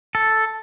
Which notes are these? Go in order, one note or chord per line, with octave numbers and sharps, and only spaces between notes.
A4